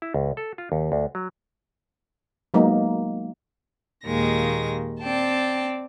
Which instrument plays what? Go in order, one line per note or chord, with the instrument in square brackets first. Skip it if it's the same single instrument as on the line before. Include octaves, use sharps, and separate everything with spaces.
[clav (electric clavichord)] E4
C#2
A4
F4
D#2
D2
F#3
[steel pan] F#3 G#3 A#3 B3 D#4
[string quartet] D#2 A#2 D#3 G#3 A#6
C4 D5 G5 A5